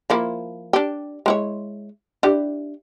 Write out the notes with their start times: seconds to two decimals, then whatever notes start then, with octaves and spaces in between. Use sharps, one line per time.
0.10 F3 A#3 E4
0.73 D4 G4
1.26 G#3 E4 C#5
2.23 D4 E4 G4